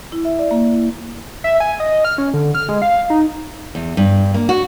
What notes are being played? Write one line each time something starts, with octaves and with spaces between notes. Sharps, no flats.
E4
E5
D5
A#3
E4
E5
G#5
D#5
F6
C#4
D3
F6
G#3
F5
D#4
E2
G2
A#3
F#4